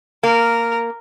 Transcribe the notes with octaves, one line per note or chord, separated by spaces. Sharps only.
A#3 A#4